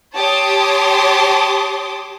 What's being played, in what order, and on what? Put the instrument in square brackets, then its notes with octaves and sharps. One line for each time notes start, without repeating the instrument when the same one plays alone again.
[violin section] G4 C#5 A5 C6 D6 D#6